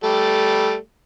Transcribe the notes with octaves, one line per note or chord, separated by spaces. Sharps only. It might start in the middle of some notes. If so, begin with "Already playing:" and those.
G3 A3